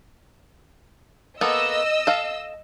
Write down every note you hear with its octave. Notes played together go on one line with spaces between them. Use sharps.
A#3 B3 A4 D#5 E6
A4 F5